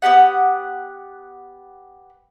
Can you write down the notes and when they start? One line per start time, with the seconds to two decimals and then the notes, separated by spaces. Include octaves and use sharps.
0.02 B3 D#4 G4 F#5